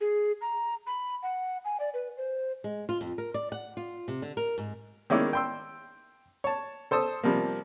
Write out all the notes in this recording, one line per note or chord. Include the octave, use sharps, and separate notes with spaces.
G#4
A#5
B5
F#5
G#5
D5
B4
C5
G#3
F4
F2
A#4
D5
F#5
F4
C3
D3
A#4
G#2
D#3 G#3 A#3 C#4 E4 D5
G5 C6 E6
C#5 A5
A4 C5 A5 D#6
C3 F3 G3 A#3